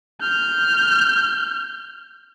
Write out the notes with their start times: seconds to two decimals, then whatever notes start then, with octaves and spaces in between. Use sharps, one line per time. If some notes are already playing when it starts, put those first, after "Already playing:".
0.21 F6 G6